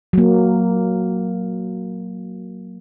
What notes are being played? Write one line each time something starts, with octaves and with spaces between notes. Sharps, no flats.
F#3 A#3